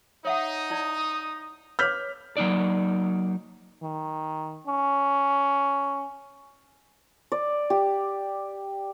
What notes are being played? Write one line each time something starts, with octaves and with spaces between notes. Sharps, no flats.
D#4 C#5 E5 F#5 D#6
E4 D5
B4 C#5 D6 F6 G6 B6
F#3 A#3 D#4 D5
D#3
C#4
D5
G4